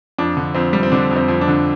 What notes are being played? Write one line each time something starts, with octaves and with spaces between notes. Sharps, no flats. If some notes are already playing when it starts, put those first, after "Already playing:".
F2 D4
D3
F2 C4
G3
C4
D3 D4
F2
C4
F2
D4
D3